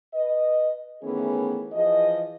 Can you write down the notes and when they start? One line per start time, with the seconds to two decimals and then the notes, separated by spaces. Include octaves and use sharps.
0.14 B4 D#5
1.02 D#3 E3 A3 B3 C#4 G#4
1.73 E3 F3 G#4 D#5